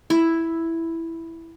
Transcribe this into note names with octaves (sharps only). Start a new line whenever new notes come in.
E4